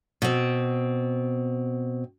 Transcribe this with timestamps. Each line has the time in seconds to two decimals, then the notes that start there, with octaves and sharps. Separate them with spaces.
0.22 B2 C4